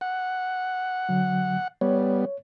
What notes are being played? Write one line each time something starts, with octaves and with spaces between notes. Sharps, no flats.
F#5
D3 F#3
G3 B3 C#5